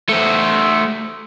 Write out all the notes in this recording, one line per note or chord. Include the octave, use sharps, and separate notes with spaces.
A3 C5